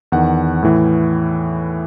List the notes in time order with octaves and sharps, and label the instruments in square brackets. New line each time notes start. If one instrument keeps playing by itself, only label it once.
[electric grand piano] E2 D#3 F#5
A2 E3